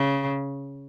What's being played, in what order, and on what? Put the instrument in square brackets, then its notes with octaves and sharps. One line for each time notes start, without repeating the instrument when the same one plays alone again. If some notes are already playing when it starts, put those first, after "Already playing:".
Already playing: [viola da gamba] C#3